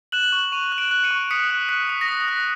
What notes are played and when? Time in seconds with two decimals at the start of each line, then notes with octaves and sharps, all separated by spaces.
0.12 F#6 E7 F#7
0.32 C#6
0.52 C#6 D#7 F7
0.72 F#6
0.78 D7 E7
0.91 F#6
1.04 C#7 D#7
1.11 C#6
1.31 D#6 B6 C#7
1.50 F#6
1.69 F#6 B6
1.89 D#6
2.01 A#6
2.08 D#6 B6
2.28 F#6